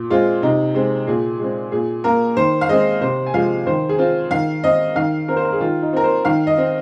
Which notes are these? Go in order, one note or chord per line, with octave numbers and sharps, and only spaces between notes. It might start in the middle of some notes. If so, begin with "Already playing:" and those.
Already playing: A#2
G#3 C4 F4
C3 D#4
G#3 C4
A#2 G#4
G#3 C4
A#2 G#4
A#3 A#4
D#3 C5
F5
G#3 C4 D#5
C3 C5
G#5
F3 G#3 C4 F5
D#3 C5
G#4
C4 F4
D#3 F5
C4 D#5
D#3 F5
C4 A#4
C5
A#4
G#4
D#3 F4
D#4
C4 A#4
C5
D#3 F5
D#5
C4